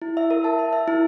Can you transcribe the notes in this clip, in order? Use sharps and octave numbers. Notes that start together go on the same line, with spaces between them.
E4
E5
A#4
A5
E5
E5
E4